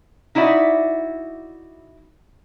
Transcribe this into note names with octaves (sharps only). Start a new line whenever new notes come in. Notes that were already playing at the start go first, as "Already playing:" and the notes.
D#4 E4 F#4 D5 E5